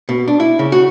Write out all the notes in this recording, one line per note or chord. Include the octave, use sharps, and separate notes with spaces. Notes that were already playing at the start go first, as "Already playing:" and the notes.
B2
D4
E4
C#3
F#4